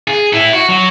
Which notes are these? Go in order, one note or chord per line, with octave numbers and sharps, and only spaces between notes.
G#4
E4 A4
F#4
F#3